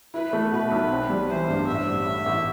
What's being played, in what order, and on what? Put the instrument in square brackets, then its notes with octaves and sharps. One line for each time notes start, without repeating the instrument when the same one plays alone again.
[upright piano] E4 [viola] B4
[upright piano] A3
[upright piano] B2 [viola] B4
[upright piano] B1
C4
G3
[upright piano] E3 [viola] C5
[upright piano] G2
[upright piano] A1 [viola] E5
[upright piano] G3
A2
A1